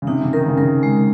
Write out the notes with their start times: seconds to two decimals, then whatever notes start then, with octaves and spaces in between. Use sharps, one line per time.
0.02 C#3
0.07 C3 D#4
0.21 C#3
0.33 D#3 A#4
0.46 C#3
0.58 C#3 A#4
0.83 G#3